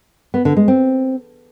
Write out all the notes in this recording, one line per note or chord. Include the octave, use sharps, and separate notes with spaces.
B3
D3
G#3
C4